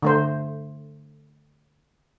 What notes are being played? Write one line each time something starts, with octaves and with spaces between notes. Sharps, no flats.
D3 A3 C5